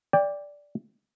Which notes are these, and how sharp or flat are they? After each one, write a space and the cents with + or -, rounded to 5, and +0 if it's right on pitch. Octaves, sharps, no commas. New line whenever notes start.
D5 -10 G5 +25